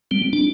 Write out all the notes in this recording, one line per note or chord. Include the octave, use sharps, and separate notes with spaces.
G3 C4
D4